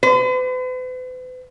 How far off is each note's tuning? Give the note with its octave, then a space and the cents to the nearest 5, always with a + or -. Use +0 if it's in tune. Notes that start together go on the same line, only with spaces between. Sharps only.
B4 +45